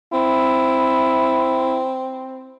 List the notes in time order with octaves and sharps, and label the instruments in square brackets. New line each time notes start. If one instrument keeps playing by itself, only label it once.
[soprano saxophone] C4 [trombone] E4